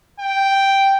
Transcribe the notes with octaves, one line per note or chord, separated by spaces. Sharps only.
G5